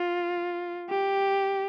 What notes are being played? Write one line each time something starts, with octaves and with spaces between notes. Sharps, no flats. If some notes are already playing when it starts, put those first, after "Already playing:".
Already playing: F4
G4